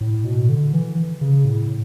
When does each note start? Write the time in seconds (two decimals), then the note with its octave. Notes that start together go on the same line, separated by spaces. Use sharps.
0.01 A2
0.24 B2
0.49 D3
0.73 E3
1.21 C#3
1.45 A2